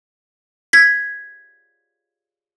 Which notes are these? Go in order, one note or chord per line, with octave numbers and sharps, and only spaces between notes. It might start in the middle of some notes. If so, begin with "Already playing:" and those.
G#6 B6